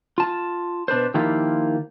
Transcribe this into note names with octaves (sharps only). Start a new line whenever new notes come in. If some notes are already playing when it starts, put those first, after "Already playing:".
F4 A5
B2 D4 B4 C5
D#3 F3 A#3 E4 F4 G4